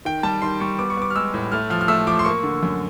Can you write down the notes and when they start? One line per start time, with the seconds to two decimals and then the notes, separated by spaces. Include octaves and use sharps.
0.05 D#3 G5
0.23 G3 A5
0.42 D#3 C6
0.60 G3 C#6
0.79 B3 D6
0.90 C#6
0.97 B3 D6
1.10 F6
1.15 G#3 E6
1.34 A2
1.52 A3 F6
1.70 F3 F6
1.81 F6
1.88 A3 E6
2.07 F3 D6
2.19 C6
2.25 A#3 C#6
2.43 D3
2.63 F#2